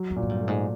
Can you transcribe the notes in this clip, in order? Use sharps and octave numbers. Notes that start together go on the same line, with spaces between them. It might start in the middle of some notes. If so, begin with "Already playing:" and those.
Already playing: F#3
F2
A#2
G#2
G2
A3
G#2